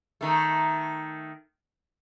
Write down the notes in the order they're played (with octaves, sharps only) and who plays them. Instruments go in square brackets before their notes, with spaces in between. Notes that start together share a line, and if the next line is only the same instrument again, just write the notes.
[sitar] D#3 A3